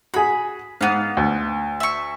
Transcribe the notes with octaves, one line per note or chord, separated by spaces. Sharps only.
F#4 G#4 B5
G#2 B3 F5
D2
E5 C#6